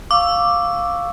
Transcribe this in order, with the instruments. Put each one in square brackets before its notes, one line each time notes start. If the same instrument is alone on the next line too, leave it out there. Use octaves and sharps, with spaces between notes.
[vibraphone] F5 C#6 E6 [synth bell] D6